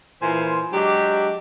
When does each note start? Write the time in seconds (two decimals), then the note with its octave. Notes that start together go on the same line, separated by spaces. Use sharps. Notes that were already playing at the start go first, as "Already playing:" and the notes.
0.22 A#2 E3 C5 G#5 C6
0.73 F#3 G#3 D4 G4